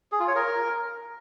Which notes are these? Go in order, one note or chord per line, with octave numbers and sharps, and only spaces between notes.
G#4
F4
C#5
A#4